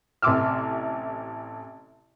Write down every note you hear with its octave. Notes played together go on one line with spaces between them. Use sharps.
A1 C3 C6 D6 E6 F6